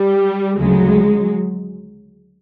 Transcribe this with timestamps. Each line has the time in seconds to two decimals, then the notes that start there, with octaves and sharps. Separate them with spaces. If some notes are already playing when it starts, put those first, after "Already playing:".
Already playing: G3
0.58 D2 C#3 F3 F#3 G#3